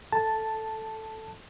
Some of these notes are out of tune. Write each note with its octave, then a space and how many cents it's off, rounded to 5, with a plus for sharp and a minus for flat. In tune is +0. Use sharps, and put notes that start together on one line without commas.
A4 +0 A5 +0